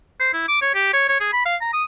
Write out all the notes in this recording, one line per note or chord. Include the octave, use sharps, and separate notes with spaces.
C5
E4
D6
C#5
G4
C#5
C#5
G#4
B5
F5
A#5
D#6